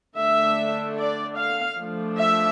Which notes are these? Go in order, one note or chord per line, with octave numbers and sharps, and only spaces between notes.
D3 A3 D4 E5
D5
F5
F3 A3 D4
E5